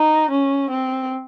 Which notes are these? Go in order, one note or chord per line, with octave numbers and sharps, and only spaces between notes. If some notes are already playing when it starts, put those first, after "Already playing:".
Already playing: D#4
C#4
C4